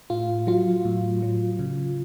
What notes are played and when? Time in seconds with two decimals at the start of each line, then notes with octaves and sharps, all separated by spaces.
0.10 A2 F4
0.47 F#3 F4
0.85 A2
1.22 F#3
1.59 C#3